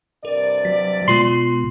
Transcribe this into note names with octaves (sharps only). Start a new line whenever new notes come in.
G2 C3 A#4 D5
F#3 B6
B2 G#3 F4 C6 F#7